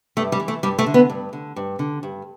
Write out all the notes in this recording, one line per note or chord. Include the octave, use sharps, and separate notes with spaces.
G2 A3
G3
E3
A3
G2 G3
A3
D3
B3
G2
D3
G2
D3
G2